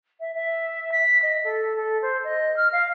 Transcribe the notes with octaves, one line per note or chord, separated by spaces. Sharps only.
E5
E5
B6
D#5
A4
A4
C5
D#5
F6
F5